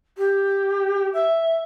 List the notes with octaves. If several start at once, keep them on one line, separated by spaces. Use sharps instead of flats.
G4
E5